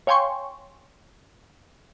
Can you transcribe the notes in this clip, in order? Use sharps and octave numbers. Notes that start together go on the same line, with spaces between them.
C#5 F5 G5 G#5 C6 C#6